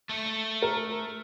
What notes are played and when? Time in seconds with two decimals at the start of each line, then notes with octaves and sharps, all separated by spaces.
0.09 A3
0.62 A#4